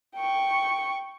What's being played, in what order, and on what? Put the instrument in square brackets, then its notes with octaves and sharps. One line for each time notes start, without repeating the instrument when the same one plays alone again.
[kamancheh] G5 C#6